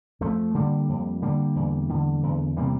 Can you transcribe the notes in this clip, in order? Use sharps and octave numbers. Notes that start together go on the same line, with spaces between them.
F2 F3 A3
D3 G3 A#3
F2
D3 G3 A#3
E2
D3
E2
C3 G3 A#3